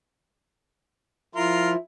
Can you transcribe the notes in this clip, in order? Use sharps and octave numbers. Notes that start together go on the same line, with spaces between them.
F3 E4 F4 A#4 C6